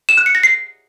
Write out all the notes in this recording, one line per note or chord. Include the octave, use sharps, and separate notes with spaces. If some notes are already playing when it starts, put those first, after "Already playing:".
E7
F#6
C#7
A#6
C7